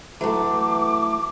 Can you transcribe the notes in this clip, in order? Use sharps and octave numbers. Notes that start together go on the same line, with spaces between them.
E3 F#3 A3 D6